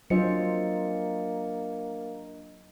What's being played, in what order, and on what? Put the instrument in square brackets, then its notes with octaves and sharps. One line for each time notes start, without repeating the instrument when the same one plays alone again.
[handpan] F#3 F4 C5 [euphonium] A#3 [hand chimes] D4 D#5 C#7